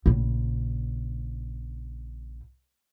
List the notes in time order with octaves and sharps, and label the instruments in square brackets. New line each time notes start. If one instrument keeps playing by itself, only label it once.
[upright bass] A#1 C#3